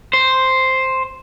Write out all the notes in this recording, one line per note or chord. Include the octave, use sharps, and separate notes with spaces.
C5